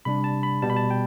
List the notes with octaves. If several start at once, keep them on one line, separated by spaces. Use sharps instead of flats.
C3 G3 D4 B5
A5
B5
B2 G3 B3 A5
B5
A5
G5